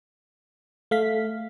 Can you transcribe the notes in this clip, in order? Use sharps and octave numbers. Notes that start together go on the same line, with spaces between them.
A3 F5 B6